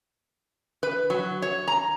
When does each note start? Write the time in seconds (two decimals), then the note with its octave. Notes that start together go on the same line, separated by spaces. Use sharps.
0.83 B4
1.10 F#3
1.42 C#5
1.68 A#5